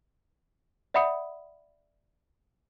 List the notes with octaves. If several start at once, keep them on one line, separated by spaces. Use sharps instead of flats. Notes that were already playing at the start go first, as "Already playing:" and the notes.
D5 E5 F#5 B5 D#6 C#7